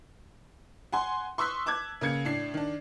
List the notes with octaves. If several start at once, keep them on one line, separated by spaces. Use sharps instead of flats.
F#5 G#5 C6
C6 C#6 D#6 E6 F#6 B6
A5 D6 F#6 G#6
C#3 A#3 G#6 C#7
A2 D4 C7
D#3 D4